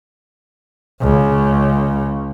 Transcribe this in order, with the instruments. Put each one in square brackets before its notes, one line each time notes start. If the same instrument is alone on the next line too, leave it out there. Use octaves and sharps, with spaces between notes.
[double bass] C#2 C#3